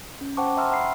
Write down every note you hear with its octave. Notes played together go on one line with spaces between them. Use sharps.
C#4
C5 F#5 G5 A5 C#6 D6
E5 G5 A#5 C6 E6 F6
F#5 B5 C7